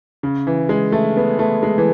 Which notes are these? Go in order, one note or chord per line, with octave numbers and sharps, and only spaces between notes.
C#3
E3
G#3
A3
B3
A3
G#3
E3